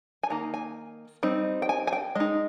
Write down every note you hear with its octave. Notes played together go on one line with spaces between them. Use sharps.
G#5
D#3 A#3 D#4 A#5
G#5
G3 C4 D#4
G5
G#5
G#5
G5
G#3 D#4 D#5